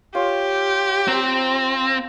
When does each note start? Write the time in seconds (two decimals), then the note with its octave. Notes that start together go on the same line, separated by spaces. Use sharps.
0.15 F4 G4 C#5
1.08 C4 C5 A#5